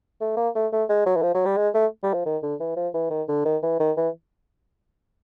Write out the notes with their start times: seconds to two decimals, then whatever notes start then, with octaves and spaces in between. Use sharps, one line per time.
0.21 A3
0.37 A#3
0.55 A3
0.72 A3
0.89 G#3
1.06 F#3
1.16 E3
1.22 F3
1.34 F#3
1.46 G3
1.57 G#3
1.74 A3
2.03 G3
2.13 F3
2.25 D#3
2.43 D3
2.60 E3
2.76 F3
2.94 E3
3.10 D#3
3.28 D3
3.45 D#3
3.63 E3
3.79 D#3
3.97 E3